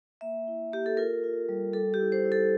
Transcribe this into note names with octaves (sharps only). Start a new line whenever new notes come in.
A#3 E5
E4
A#3 G4
A4
F4 A#4
F4
G3
G3 A4
G4
E4
C5
E4
A4